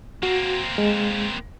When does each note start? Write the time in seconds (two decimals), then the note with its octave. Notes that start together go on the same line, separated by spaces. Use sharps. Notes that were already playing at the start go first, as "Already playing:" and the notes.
0.23 A#3 C4 F#4
0.78 G#3